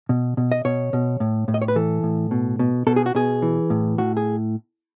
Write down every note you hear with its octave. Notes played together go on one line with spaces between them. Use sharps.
B2
B2
D#5
B2 C#5
B2
A2
A2
D#5
C#5
B4
E3 A4
A2
B2
B2
B2 A4
G#4
F#4
B2 G#4
E3
A2
A2 F#4
G#4